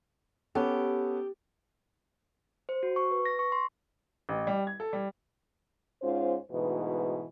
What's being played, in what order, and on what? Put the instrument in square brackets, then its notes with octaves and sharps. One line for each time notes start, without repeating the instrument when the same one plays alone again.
[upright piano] B3 C#4 A4 [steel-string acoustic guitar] G4
[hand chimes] C5
F#4
C#6
B4
A#6
C#6
C6
[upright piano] A1
G3
G#6
A4
G3
[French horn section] G#2 C#4 F4 C5
D2 G#2 B2 E3 B4